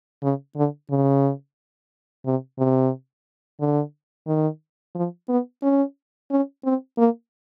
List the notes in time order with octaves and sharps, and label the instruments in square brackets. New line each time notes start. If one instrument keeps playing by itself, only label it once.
[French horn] C#3
D3
C#3
C3
C3
D3
D#3
F3
B3
C#4
C#4
C4
A#3